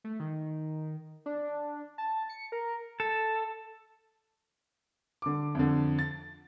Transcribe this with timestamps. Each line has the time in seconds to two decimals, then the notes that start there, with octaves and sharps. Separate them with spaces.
0.04 A3
0.20 D#3
1.26 D4
1.98 A5
2.29 C#7
2.52 A#4
3.00 A4
5.22 D3 D6
5.55 F2 D3
5.99 A6